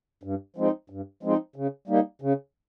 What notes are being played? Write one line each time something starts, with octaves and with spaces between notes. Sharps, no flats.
G2
F3 G#3 C4 D#4
G2
F3 G#3 C4 D#4
C#3
G3 A#3 D#4
C#3